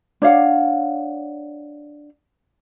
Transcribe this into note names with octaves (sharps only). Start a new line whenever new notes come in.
D4 C#5 F5 F#5